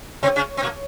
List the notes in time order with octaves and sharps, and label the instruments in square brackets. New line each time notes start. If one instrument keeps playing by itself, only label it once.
[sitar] C3 C4 [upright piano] C#5
[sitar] C#3 C#4
C4
A#2 A#3